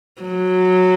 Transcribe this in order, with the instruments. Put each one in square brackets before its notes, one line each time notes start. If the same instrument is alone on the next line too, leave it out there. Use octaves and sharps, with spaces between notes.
[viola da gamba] F#3